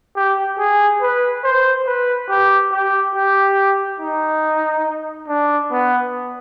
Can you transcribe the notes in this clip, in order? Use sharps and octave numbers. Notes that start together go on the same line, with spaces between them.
G4
G#4
B4
C5
B4
G4
G4
G4
D#4
D4
B3